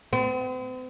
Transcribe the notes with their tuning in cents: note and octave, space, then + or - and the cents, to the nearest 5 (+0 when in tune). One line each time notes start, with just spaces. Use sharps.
C4 -45